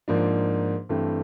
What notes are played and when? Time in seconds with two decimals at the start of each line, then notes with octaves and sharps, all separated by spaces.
0.08 G#2 F3 A#3 D4
0.89 G2 E3 A3 C4